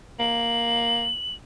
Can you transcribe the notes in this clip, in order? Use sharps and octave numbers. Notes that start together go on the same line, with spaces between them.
A#3 F#7